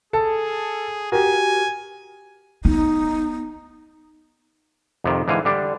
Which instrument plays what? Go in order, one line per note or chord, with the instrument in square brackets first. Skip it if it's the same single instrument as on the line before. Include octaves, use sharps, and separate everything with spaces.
[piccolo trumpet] G#4 [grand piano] A4
[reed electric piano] F#4 G4 [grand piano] A#4 [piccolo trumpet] G#5
[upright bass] B3 [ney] D#4
[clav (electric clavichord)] F2 C3 D#3
G#2 D3 E3 F5 G#5
D3 G3 D4